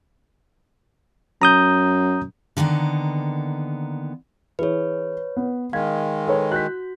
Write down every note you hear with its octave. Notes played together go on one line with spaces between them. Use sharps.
F#2 A#5 D#6 G6
D3 D#3 A#3 B3
E3 G#4 B4 C#5
B3
D#3 G#3 F5 G#6
A4 B4 C#5
F#4 F#6 G6 B6